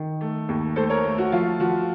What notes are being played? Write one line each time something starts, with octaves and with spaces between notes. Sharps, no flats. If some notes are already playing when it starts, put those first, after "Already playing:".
Already playing: D#3
A3
D#2
A3 A4 C5
A#4 C#5
A3
F#4
F3 F4
F3 F#4